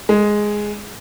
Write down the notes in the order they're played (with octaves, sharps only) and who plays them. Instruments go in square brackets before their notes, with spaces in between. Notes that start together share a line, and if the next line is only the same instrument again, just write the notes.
[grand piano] G#3